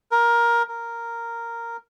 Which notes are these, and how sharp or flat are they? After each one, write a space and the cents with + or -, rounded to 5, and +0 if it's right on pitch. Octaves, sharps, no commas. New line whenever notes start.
A#4 +15
A#4 -5